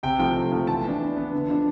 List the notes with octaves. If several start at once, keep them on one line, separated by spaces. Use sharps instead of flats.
C3 G5
F3 A3 G5
C3
F3 A3
E3 A5
B3 D4
E3
B3 D4
D3
F3 B3 D4